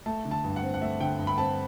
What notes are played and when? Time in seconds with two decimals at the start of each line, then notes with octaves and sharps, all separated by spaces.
0.06 A3 A5
0.25 D3
0.31 A5
0.44 G2
0.56 F#5
0.63 C4
0.74 F#5
0.81 A3 E5
1.00 D3 G5
1.19 G2
1.27 B5
1.38 C4 A5